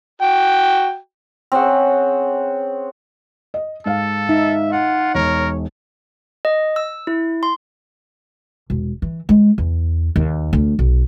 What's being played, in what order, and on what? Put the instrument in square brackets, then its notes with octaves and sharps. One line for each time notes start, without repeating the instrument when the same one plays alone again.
[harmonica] F#4 G5
[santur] C4 C#4 G#4 F#5
[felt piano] D#5
[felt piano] G#2 F5 [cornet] A4
[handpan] D#4 [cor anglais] E5
[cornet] F4 [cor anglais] F#5
[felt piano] E1 [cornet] A#4 [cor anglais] C#5
[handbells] D#5
E6
E4
C6
[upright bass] E1
E3
G#3
E2
D#2
D2
B1